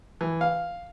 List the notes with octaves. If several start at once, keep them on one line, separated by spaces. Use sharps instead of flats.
E3
F5